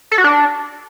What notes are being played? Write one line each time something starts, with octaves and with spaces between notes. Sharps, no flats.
A4
F#4
D4